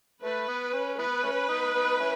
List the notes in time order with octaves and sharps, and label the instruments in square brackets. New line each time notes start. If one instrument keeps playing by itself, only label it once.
[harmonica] A3 [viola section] B4
[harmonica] B3
C#4
[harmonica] E3 B3 [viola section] B4
[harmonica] A3 C#4
B3 D#4
B3 D#4
C#4 E4